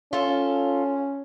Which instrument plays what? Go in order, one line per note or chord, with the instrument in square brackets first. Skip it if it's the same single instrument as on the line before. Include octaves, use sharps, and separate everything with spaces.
[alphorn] C#4 [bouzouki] F4 A4